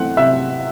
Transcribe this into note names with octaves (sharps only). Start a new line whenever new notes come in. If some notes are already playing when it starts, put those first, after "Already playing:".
Already playing: E3 A3 C4 F#5
C3 E5